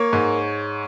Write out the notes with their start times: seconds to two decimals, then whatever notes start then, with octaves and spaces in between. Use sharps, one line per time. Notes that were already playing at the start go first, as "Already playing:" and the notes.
Already playing: A#3 C#5
0.13 G#2